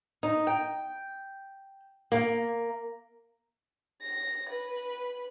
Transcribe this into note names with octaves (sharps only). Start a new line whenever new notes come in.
D#4
G5
A#3
A#6
B4